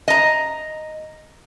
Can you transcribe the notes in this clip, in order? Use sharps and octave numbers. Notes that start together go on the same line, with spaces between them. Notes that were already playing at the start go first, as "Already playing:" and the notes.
D#5 A#5